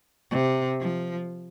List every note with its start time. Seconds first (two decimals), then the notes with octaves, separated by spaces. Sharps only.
0.31 C3
0.80 F3